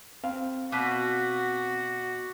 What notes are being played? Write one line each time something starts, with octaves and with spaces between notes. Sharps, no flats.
C4 F5
B2 F#4 D6 F#6 B6